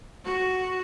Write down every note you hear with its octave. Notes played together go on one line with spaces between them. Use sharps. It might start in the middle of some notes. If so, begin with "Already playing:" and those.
F#4